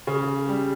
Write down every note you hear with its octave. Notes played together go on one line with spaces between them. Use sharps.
C#3
G3